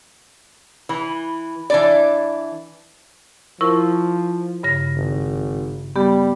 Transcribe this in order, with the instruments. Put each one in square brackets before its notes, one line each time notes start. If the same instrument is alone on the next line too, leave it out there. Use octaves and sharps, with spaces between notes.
[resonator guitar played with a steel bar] E3
E3 D4 D5
[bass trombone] F3 [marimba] E4 A#4 C#6
[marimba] G2 C#3 A#6
[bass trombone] G#1
[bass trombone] G3 [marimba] B3 G4